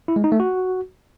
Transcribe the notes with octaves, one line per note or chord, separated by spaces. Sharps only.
E4
G#3
D#4
A3
F#4